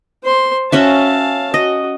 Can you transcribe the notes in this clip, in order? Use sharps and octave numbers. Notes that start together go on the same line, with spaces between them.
C5 C6
C#4 F#4 E5 F5 A5
F#4 D#5